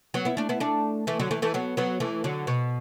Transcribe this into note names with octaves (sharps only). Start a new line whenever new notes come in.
F#3 B3
B3 E4
A3 D4
B3 E4
A3 D4
E3 A3
D3 F#3
E3 A3
E3 A3
F#3 B3
F#3 B3
E3 A3
D3 F#3
B2